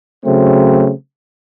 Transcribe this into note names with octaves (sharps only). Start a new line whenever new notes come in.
C#3 F#3 A3 C4